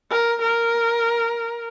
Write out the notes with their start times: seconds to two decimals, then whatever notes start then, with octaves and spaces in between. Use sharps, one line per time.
0.11 A#4
0.42 A#4